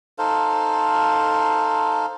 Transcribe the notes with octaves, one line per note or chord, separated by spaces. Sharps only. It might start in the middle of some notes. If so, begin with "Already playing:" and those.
D#4 A4 C5 F5